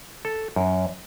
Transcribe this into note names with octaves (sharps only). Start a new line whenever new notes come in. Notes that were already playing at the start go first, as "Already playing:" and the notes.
A4
F#2